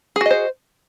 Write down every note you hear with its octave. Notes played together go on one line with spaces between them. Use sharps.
F#4 G#4 C5 D#5